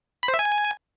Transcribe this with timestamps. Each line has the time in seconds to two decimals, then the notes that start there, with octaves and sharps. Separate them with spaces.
0.23 B5
0.28 C5
0.34 E5
0.39 G#5